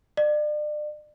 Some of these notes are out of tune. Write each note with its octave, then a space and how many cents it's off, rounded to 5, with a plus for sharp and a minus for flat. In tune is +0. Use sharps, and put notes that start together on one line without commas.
D5 +35